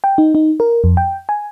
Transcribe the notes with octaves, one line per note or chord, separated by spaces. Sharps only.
G5
D#4
D#4
A#4
F2
G5
G#5